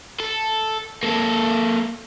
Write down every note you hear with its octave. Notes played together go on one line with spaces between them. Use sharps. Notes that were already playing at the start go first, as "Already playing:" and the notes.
A4
A#3 A4